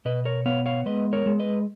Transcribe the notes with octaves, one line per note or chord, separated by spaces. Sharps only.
B2 B4 D#5
A#4 C#5
B3 C#5 F5
C#5 F5
G#3 B4 D#5
A#4 C#5
G#3
B4 D#5